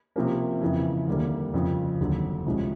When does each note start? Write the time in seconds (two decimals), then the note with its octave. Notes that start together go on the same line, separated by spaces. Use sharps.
0.16 C3 F3 A#3 C#4
0.62 F2 C#3 E3
1.08 D#2 D3 G3 A#3
1.54 F2 C#3 F3
1.99 F1 D#2 D3 F#3
2.46 C2 C3 F3 G#3 C#4